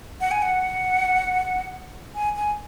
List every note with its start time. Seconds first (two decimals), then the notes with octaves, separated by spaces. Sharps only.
0.21 F#5
0.31 G#5
0.42 F#5
2.15 G#5
2.36 G#5